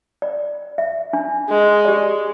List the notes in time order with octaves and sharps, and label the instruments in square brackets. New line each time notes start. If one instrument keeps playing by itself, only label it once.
[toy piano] D5
E5
D4
[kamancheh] G#3
[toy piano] G4 D5